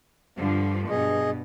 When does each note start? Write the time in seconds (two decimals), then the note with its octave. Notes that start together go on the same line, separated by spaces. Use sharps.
0.38 G2 D3 F3
0.90 G2 B2 G#4 D#5